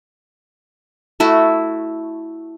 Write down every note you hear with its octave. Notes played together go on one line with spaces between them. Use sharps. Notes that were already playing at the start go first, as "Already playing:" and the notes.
A3 E4 F#4 A4